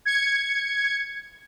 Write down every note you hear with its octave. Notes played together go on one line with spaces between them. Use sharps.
G#6 C#7